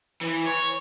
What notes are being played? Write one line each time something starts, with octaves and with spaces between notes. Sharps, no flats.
E3
C#5